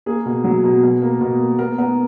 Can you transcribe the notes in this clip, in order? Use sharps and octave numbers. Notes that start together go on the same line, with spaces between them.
A#3 G#4
B2
F#3
B2
B2
A#3
B2
A#3
B3 A#4
B3 A#4